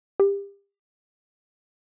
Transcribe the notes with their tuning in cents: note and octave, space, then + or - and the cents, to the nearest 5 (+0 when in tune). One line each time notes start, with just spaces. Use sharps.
G4 +30